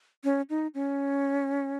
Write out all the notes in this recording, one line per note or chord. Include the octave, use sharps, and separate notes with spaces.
C#4
D#4
C#4